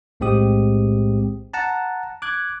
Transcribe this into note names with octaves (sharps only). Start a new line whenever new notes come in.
B1 A2 G#3 C4 G4 D#6
F#5 A5 A#5
D6 F#6 G#6